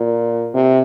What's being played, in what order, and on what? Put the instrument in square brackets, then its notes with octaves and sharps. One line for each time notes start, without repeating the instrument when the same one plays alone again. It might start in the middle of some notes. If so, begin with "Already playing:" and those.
Already playing: [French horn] A#2
C3